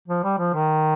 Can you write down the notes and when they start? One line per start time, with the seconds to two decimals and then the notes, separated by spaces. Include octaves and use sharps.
0.08 F3
0.24 G3
0.39 F3
0.54 D#3